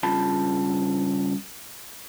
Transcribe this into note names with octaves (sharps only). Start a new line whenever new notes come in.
G2 C#3 F4 A5 B5